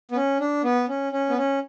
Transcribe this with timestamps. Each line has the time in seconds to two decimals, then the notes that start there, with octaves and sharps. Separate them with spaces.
0.12 B3
0.16 C#4
0.40 D4
0.64 B3
0.89 C#4
1.12 C#4
1.29 B3
1.37 C#4